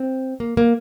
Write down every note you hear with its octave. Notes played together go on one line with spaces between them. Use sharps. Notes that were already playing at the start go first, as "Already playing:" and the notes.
Already playing: C4
A#3
A#3